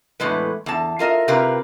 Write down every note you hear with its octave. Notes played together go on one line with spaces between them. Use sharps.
E2 A2 G#3 B4
E2 A5
F4 A#4 D#5 E5
C3 F4 G4 A#4 B4